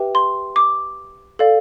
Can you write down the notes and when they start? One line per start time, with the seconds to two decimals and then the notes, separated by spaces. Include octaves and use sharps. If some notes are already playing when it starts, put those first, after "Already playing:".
Already playing: G4 B4 E5 G5
0.15 C6
0.56 D6
1.39 A4 D5 F5